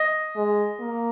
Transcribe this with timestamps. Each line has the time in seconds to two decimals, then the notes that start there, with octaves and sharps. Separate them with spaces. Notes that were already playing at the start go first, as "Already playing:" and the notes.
Already playing: D#5
0.36 G#3
0.81 A#3